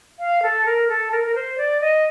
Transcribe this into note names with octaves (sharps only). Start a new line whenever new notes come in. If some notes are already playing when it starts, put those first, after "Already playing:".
F5
A4
A#4
A4
A#4
A#4
C5
D5
D#5